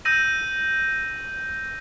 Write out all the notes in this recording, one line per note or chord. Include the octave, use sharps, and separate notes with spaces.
E6 G6 A#6 D#7